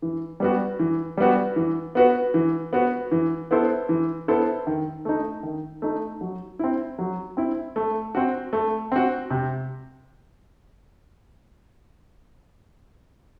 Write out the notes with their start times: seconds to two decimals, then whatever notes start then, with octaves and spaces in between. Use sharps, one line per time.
0.02 E3
0.40 G3 B3 F#4
0.79 E3
1.17 G3 B3 F#4
1.56 E3
1.95 B3 F#4 B4
2.34 E3
2.73 B3 F#4 B4
3.12 E3
3.51 B3 E4 A4 C5
3.89 E3
4.28 B3 E4 A4 C5
4.67 D#3
5.05 A3 D#4
5.43 D#3
5.82 A3 D#4
6.21 F#3
6.59 C4 E4
6.99 F#3
7.37 C4 E4
7.76 A3
8.15 C4 F#4
8.53 A3
8.92 C4 F#4
9.30 C3